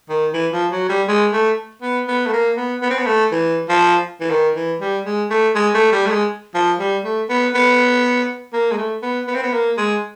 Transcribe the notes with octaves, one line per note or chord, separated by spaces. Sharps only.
D#3
E3
F3
F#3
G3
G#3
A3
B3
B3
A3
A#3
B3
B3
C4
B3
A3
E3
F3
E3
D#3
E3
G3
G#3
A3
G#3
A3
G3
A3
G#3
F3
G3
A3
B3
B3
A#3
G#3
A3
B3
B3
C4
B3
A#3
G#3